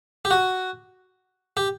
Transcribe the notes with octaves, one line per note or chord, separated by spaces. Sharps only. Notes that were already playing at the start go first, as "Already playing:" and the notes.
G4
F#4
G4